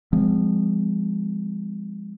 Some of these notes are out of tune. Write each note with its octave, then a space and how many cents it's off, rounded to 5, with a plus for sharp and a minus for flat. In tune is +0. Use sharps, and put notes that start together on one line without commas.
F3 +0 G#3 -25 C4 -40